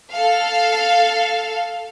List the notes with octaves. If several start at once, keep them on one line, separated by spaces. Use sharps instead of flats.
A4 F5